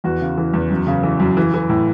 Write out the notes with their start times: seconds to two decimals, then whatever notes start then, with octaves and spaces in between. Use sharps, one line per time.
0.04 E2 F#4
0.21 C#3
0.38 E3
0.53 E2
0.70 F#2
0.87 C#3
1.04 E3
1.20 F#2
1.37 E3
1.54 E3
1.69 A2